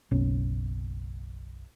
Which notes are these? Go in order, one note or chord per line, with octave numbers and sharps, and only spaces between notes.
F#1 B1 C#4